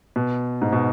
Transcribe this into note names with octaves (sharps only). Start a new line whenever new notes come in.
B2
G#2
B2